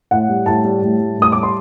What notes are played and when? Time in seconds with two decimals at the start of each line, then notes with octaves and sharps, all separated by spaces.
0.11 A2 F#5
0.29 G3
0.46 A2 A5
0.64 G3
0.82 A2
1.00 G3
1.18 A2 D#6
1.32 G3 D6
1.43 C6